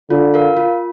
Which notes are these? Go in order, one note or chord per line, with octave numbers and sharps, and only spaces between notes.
D3 F4
A#4 F5
F4